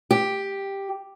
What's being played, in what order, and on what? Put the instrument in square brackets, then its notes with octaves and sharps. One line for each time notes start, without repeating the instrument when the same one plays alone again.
[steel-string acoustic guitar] G4